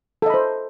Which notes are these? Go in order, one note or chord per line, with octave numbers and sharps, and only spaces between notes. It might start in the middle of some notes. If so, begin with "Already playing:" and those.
A4 C5 D#5 B5